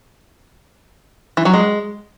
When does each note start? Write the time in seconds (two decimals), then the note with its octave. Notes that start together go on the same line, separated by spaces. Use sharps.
1.37 E3
1.45 F#3
1.54 G#3